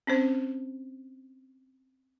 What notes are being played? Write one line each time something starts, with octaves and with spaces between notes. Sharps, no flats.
C4 C#4 C5